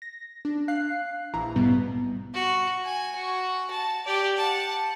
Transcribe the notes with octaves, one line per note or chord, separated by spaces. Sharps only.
A#6
D4
F5 F#6 C7
A#1 E3 E4 A#5
G#2 B2 G3 B3
F#4
G#5
F#4
A5
G4 D5
F#5 A5